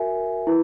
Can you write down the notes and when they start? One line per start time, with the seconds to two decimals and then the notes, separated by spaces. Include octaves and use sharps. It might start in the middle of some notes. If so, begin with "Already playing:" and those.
Already playing: F#4 A#4 E5 G#5
0.47 E4 B4